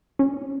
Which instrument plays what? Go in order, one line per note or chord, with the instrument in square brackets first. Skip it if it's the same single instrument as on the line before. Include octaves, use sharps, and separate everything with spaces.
[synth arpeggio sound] C#4